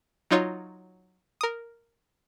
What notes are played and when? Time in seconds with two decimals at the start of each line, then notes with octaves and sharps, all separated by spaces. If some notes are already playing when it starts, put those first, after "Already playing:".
0.31 F#3 D#4 F4 C#5
1.41 A#4 D#6